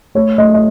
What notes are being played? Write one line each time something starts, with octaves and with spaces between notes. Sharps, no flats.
A3 C#5
A3 D#5
D#5